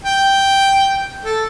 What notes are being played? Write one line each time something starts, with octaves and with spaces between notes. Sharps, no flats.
G5
A4